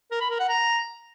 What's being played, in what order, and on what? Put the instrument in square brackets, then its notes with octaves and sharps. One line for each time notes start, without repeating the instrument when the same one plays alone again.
[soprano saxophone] A#4
B5
A#4
F#5
A#5